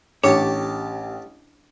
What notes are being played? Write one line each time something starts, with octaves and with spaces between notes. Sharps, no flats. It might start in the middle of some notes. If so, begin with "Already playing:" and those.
A1 D4 G4 C#5 A5